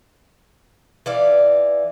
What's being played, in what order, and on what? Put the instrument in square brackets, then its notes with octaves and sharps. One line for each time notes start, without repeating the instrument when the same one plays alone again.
[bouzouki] E3 D5 F5